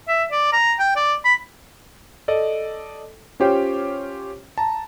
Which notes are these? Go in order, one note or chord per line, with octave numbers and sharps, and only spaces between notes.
E5
D5
A#5
G5
D5
B5
A4 D5 D#5
C#4 F4 G4 C5 C#5 G5
A5 A#5